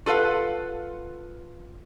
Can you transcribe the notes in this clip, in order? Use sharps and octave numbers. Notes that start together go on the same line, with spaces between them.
F4 A4 B4 F5 F#5